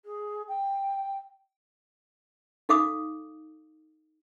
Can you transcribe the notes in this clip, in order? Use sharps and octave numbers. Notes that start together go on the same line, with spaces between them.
G#4
G5
D#4 A4 F5 D6 D#6